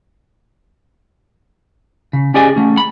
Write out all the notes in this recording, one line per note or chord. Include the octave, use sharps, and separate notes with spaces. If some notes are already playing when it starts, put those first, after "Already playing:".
C#3
C#4 G4 G#4 D5 D#5 G#5
A3 C#4
B5